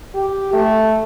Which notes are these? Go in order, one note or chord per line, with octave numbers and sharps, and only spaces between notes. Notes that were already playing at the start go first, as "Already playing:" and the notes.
G4
A3